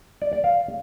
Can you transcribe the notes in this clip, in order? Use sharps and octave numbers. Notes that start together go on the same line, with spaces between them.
D5
D5
F5